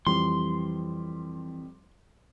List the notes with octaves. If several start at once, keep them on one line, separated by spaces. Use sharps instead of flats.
F2 E3 G3 C6